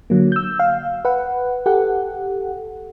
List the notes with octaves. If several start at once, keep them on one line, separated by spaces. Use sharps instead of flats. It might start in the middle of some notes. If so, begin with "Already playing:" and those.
D3 F#3 A#3
E6 G6
F5
B4 F#5
G4 A4 F#5